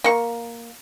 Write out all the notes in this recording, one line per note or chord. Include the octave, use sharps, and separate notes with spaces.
A#3 C#6